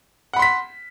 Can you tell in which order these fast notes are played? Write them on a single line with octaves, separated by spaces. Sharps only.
F#5 B5 C6 B6